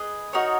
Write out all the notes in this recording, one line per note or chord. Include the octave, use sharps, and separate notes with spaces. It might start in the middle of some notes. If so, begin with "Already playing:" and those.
Already playing: G#4 B4 D#5
D#4 F#4 A#4 C#5